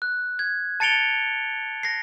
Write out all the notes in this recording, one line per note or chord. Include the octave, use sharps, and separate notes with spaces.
F#6
G#6
A5 A6 C#7 D7 F7 G7
A#6 C7